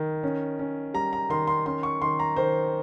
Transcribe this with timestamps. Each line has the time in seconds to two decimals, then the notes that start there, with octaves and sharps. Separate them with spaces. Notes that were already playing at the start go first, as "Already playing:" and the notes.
Already playing: D#3
0.23 C#4
0.59 C#4
0.94 G3 A#5
1.13 A#5
1.30 D#3 C6
1.47 C6
1.66 C#4 C6
1.83 C#6
2.02 D#3 C6
2.19 A#5
2.36 D#3 C5